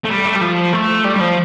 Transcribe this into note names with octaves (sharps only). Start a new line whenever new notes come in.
A3
G3
A3
G3
F3
A3
G3
G3
F3